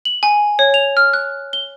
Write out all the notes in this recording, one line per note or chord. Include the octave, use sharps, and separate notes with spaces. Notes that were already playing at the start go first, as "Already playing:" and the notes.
F#7
G#5
C#5
F7
F6
F#6
G7